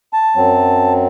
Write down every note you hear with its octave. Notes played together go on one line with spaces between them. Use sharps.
A5
F#2 F#3 C4